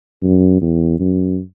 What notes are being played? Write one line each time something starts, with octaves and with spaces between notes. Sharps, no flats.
F#2
E2
F#2